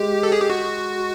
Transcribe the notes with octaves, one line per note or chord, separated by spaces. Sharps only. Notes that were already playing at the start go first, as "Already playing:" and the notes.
Already playing: G#3 G4
A4
G#4
G4
F#4